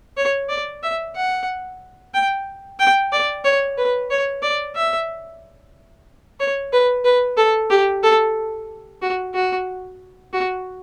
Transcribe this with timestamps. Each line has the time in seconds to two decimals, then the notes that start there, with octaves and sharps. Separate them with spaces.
0.17 C#5
0.49 D5
0.83 E5
1.15 F#5
2.14 G5
2.79 G5
3.12 D5
3.45 C#5
3.78 B4
4.10 C#5
4.43 D5
4.76 E5
6.40 C#5
6.73 B4
7.04 B4
7.37 A4
7.70 G4
8.03 A4
9.02 F#4
9.34 F#4
10.33 F#4